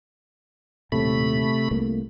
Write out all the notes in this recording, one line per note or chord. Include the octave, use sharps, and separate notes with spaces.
D#1 A2 C3 A3 B5
C2 A3 A#3